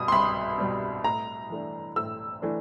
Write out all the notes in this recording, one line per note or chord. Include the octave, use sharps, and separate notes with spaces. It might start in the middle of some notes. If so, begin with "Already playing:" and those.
Already playing: C2 B2 G3 D#6
C6
C2 B5
B2 G3
A2 A#5
E3 A3 D4
A2 E6
E3 A3 D4